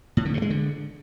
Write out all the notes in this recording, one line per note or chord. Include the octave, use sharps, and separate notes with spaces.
A2
D3
G2
G#3
D3